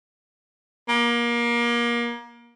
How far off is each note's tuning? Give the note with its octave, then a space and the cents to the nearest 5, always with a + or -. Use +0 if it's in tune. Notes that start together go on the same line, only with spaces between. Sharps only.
A#3 +30